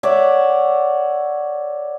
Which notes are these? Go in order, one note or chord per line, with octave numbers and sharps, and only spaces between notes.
C#5 D5 E5 F#5